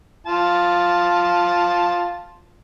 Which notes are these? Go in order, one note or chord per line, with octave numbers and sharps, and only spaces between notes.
F4 A5